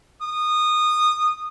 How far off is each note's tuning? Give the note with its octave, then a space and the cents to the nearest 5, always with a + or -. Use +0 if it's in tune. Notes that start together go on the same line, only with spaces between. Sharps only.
D#6 -20